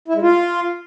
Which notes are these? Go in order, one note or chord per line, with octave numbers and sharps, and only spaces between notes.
E4
G#3
F4